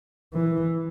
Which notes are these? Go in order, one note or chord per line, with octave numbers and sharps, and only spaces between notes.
E3